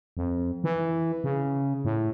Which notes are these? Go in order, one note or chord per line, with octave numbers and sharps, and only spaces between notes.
F2
E3
C#3
A2